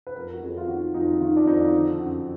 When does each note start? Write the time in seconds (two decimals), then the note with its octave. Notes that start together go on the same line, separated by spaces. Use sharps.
0.07 B4
0.16 F2 A#4
0.33 F#4
0.42 F2 G#4
0.57 F4
0.68 D#3 F#4
0.94 F2 D#4
1.20 D#3 F4
1.37 D4
1.47 F2 D#4
1.73 D3
1.99 F#2 F#4